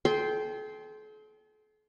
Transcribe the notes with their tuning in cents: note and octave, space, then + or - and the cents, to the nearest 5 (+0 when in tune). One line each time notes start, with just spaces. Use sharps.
A4 -45 G5 +0 C6 +0